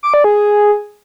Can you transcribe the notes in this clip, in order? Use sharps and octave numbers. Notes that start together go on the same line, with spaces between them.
D6
D5
G#4